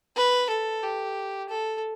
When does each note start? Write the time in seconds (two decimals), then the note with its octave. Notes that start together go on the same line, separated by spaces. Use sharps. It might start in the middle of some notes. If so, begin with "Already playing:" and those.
0.17 B4
0.50 A4
0.83 G4
1.49 A4